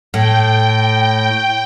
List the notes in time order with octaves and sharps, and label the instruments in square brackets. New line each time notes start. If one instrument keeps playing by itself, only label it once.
[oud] A2 [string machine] G5